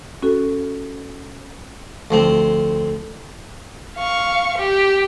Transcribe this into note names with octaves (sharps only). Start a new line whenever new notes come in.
C#4 F#4 A4
D2 F3 C4
F5 C#6
G4